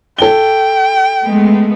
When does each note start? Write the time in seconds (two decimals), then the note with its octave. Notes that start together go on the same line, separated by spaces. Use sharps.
0.18 A4 G5 G7
1.25 G#3 A3 B3